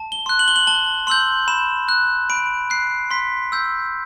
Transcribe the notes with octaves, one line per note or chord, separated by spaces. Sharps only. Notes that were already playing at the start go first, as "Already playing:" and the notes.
Already playing: A5
G7
C6 F#6
F#7
G7
F#7
A5 G7
C6 E6 G6 F#7
B5 E7
F#6
B5 D7
F#6 C7
C6 B6
E6 G6